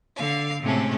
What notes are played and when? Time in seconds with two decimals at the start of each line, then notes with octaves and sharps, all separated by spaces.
0.15 D3 F5
0.61 A2 C3 G#3 A3 C#4